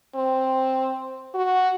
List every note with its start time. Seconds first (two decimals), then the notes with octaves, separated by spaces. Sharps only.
0.15 C4
1.35 F#4